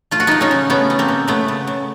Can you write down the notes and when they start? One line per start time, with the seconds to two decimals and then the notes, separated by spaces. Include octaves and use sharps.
0.11 A3 F4
0.20 F#4
0.27 A3 D#4 F4
0.41 C#4 D#4
0.51 C#3
0.70 A3 B3 C#4
0.90 A3
0.99 A#3 C4
1.08 C#3
1.28 C#3 A3 B3
1.48 C#3
1.67 C#3